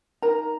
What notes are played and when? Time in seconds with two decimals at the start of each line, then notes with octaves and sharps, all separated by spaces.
0.22 D#4 A#4 A#5